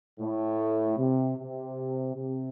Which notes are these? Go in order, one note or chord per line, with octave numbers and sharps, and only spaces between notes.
A2
C3
C3
C3